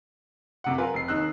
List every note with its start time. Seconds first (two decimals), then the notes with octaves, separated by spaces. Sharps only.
0.64 F#2 C3 F#5
0.78 F4 A#4 B4 G#5
0.94 F1 C7
1.08 D#2 D#4 E6 F#6